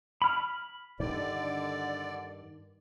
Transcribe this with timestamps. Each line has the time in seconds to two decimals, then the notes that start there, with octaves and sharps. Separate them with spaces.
0.22 B5 F6
1.00 G2 D3 D#3 D5